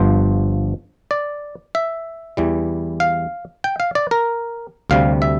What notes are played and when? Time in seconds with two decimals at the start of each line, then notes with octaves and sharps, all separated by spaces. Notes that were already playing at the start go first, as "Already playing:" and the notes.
Already playing: G1 G2 F3 C5
1.11 D5
1.75 E5
2.37 E2 E3 G3
3.00 F5
3.64 G5
3.80 F5
3.95 D5
4.11 A#4
4.90 D2 C3 G3 F5
5.22 E5